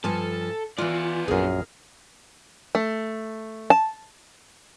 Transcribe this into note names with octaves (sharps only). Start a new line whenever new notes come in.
G2 F3 A4 G#5
E3 B3 F4 D5
A#1 F#2 G#4 A#4
A3
A5